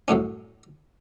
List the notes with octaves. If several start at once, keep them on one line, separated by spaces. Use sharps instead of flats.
C2 F#2 A2 C#4